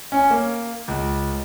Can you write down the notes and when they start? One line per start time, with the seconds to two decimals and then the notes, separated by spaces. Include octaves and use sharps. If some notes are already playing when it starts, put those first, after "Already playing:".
0.12 C#4
0.31 A#3
0.88 C#2